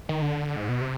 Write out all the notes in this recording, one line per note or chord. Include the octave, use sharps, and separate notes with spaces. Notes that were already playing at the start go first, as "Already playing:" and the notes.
D#3
D3
G#2
B2
C3